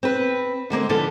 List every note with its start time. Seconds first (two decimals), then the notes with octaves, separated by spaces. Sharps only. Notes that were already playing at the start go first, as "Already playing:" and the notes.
0.03 C4 B4
0.70 D3 G#3 A#3 C4
0.89 D3 F3 D4 A4 B4